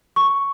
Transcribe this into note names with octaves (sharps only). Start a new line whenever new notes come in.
C#6